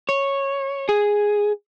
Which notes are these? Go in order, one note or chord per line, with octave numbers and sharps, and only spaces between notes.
C#5
G#4